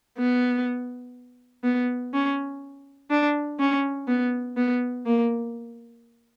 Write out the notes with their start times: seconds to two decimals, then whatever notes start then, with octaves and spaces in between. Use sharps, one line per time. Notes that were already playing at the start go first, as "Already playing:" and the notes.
0.18 B3
1.64 B3
2.14 C#4
3.11 D4
3.60 C#4
4.08 B3
4.57 B3
5.06 A#3